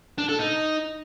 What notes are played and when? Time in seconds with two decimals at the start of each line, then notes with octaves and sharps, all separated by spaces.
0.18 D4
0.29 A4
0.39 D#4